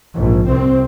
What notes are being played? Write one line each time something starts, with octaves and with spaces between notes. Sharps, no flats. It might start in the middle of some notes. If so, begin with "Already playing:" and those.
A#1 G#2
C2 C4